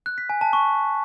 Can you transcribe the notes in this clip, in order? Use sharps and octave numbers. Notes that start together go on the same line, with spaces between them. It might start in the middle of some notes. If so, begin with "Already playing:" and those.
F#6
B6
G#5
A5
C#6